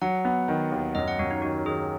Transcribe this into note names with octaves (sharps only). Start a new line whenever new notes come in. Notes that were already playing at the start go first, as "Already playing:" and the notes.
F#3 F#5
B3
D#3
D#2
F#2 D#5
F#5
F#2 F#4
D#4
D#3 F#4
D#3 G#4